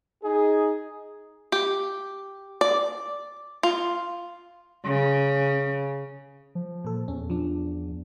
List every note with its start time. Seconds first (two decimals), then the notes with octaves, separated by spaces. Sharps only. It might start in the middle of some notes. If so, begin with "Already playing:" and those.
0.23 D#4 G#4
1.52 G4
2.61 D5
3.63 F4
4.85 C#3
6.55 F3
6.85 A#2 A4
7.08 E2 C#4
7.30 F3 D4